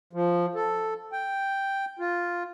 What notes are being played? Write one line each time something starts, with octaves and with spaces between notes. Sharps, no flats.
F3
A4
G5
F4